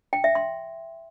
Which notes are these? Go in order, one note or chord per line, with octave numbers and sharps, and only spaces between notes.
G5
E5
C6